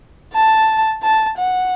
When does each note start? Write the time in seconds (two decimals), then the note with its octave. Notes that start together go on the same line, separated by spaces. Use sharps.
0.34 A5
1.03 A5
1.37 F#5